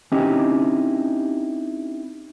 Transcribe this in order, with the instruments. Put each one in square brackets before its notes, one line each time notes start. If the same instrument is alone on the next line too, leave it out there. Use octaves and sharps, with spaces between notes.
[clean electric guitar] C4 C#4 D#4 E4 G4 D#5